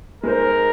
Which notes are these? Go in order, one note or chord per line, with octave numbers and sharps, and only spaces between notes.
G#3 D#4 A#4 C5